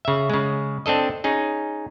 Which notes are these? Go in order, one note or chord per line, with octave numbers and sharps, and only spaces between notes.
C#3 E5
C#3 G#3
C4 D4 A4 D#5
C#4 D#4 G#4